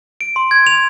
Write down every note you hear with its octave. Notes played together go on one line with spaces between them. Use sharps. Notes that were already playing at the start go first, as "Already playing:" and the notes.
D7
C6
G#6
F7